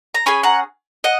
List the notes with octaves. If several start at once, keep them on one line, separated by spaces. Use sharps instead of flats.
A#5
C#4 G#4 G#5 B5
F#5 A#5
D#5 F#5